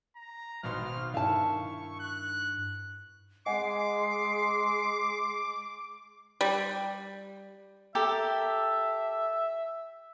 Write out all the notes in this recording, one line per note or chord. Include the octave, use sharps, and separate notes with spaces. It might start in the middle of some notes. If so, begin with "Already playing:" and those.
A#5
G#1 B2 C6 F6
G2 D#3 E4 F5 A5 C#6
F#6
G#3 D#5 F#5 G#5 D6 C7
G3
G4 A4 A#4 E5